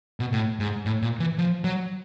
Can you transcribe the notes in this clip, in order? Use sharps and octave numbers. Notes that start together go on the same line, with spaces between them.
B2
A2
G#2
A2
A#2
E3
F3
F#3